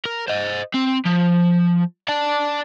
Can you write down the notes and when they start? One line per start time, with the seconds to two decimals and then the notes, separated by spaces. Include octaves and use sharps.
0.05 A#4
0.28 C5 D#5
0.74 C4
1.06 F3
2.08 D5 A5